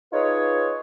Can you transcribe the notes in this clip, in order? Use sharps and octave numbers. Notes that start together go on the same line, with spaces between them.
D#4 F4 G#4 B4 C#5